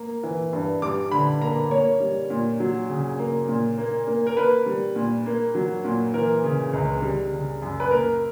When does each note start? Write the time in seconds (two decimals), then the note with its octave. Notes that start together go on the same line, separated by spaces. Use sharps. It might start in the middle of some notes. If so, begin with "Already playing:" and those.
Already playing: A#3
0.23 E3
0.53 G2
0.82 G3 D6
1.11 D3 B5
1.41 A#3 A#5
1.71 A#3 C#5
2.00 G3
2.30 A#2
2.60 F#3
2.90 C#3
3.19 A#3
3.49 A#2
3.78 A#3
4.07 A#3
4.27 A#4
4.37 A#3 B4
4.66 G3
4.96 A#2
5.26 A#3
5.55 F#3
5.85 A#2
6.14 E3 A#4
6.44 C#3
6.73 C#2
7.02 G3
7.32 C#3
7.62 F#2
7.80 B4
7.91 A#3 A#4